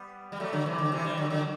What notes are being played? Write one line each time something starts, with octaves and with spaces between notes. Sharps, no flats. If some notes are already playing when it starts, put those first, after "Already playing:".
Already playing: G3 B3
G3
F#3 A3
D3 F#3
C3 E3
D3
C3 E3
E3 G3
D3 F#3
D3 F#3